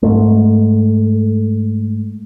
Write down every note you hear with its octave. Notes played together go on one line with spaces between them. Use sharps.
G#2 A3